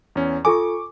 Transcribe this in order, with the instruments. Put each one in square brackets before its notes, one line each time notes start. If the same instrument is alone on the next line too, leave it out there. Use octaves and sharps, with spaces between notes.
[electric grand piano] E2 C#4
[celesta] F4 A4 G#5 [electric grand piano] C#6 D6